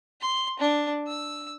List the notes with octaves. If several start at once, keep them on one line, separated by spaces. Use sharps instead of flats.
C6
D4
E6